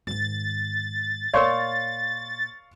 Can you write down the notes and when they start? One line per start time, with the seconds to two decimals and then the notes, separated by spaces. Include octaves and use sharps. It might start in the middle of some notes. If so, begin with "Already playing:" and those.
0.07 G#2 D#3 A6
1.34 A#2 A#4 C#5 D5 F5 C6 C#6